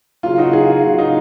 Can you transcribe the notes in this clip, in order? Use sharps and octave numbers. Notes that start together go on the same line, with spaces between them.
C#3 F#3 A#3 F4
D#4 F#4
F4 G#4
C#3 F#3 A#3 F4
D#4